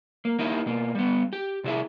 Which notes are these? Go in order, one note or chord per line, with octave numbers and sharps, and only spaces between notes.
A#3
A#3 D#4 E4 G4
B2 A#3
G3 B3
G4
C3 E4 G#4 E5